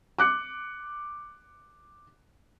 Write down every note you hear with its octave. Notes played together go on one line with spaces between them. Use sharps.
D6 F#6 C#7